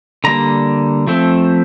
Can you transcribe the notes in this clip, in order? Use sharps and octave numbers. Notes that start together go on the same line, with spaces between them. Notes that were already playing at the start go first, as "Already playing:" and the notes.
D3 G3 A#3 A#5
F3 A3 C4